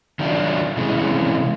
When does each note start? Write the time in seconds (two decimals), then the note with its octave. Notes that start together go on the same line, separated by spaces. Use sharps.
0.19 D#3 F#3 D4 E4 F4
0.77 C3 E3 G#3 C#4